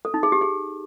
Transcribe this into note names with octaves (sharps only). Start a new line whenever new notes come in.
A4
D#4
G#4
G4
G#4